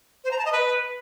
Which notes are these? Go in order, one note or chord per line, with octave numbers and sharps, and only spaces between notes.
C5
A#5
A5
D#5
B4